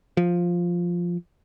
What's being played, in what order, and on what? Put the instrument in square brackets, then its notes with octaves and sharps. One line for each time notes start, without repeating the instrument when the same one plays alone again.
[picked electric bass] F3